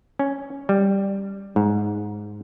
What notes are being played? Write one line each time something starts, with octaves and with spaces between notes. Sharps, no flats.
C#4
G3
G#2